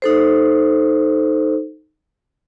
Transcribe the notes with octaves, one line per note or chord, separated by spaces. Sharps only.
D#4 A4 C5